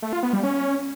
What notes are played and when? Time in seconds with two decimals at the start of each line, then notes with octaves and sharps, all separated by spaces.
0.02 A3
0.13 F4
0.23 B3
0.33 G3
0.43 C#4